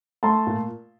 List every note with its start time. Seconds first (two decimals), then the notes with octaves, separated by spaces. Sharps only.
0.23 A3 A5 C6
0.47 A#2